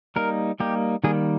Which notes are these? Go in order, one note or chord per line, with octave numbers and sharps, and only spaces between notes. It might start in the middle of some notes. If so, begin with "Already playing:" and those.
G3 A#3 D#4 A#4
G3 A#3 D#4 G4
D#3 G3 A#3 G#4